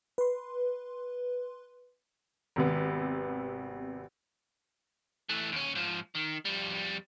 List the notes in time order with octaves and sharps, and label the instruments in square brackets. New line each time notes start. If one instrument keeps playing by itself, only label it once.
[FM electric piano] B4 C6
[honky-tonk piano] G#1 C3 B3
[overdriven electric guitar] E3 A3
D#2 C#4
G#2 F3
D#3
F2 G3